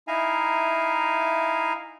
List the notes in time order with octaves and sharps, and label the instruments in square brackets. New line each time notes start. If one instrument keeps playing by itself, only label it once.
[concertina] D#4 E4 E5 F5 G#5 A#5